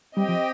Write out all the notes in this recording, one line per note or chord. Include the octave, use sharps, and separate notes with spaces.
G3 C4 G4 D#5 G5
F3